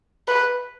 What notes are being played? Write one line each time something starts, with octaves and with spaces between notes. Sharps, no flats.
B4